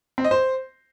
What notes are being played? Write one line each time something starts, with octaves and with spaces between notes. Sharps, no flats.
C4
D#5
C5